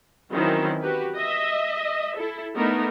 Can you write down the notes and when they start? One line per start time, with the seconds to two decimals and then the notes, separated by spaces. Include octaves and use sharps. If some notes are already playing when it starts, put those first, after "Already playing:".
0.31 D#3 E3 F#3 C4 C#4 E4
0.82 F#4 G4 B4
1.16 D#5 E5
2.16 E4 A4
2.54 A3 B3 D4 D#4 A#4